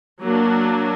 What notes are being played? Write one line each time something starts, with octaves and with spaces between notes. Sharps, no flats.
F#3 A#3 D4